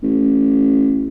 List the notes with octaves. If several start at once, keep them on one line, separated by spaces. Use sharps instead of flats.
A1